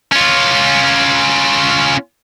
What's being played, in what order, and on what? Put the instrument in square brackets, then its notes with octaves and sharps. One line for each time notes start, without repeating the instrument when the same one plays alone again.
[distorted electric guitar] C#4 F4